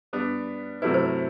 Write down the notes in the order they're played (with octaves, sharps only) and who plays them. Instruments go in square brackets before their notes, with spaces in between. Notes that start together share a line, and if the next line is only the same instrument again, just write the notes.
[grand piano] G3 B3 D4
[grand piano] C3 F#3 A3 E4 [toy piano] B4
[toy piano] C5
C5